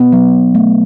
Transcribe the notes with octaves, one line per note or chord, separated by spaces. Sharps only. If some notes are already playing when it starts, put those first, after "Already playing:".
Already playing: B3
F#3
A3